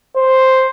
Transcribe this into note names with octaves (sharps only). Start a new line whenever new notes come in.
C5